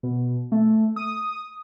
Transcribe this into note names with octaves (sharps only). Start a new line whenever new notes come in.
B2
A3
D#6